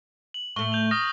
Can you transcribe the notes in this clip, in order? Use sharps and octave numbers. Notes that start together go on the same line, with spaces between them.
F#7
A2 A3 C#6 G7
G6 F7 F#7
D#6 F6 A#6